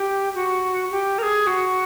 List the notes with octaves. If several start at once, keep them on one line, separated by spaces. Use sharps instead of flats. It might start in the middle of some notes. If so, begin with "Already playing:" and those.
Already playing: G4
F#4
G4
A#4
G#4
F#4